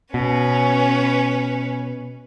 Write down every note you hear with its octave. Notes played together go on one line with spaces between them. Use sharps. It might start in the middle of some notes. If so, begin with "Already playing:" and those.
B2 C#4 B4